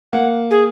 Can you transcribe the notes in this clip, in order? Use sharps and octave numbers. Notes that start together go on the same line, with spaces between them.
A#3 F#5
G#4